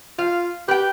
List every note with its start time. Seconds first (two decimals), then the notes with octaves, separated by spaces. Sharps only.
0.19 F4 F5
0.68 G4 B4 G5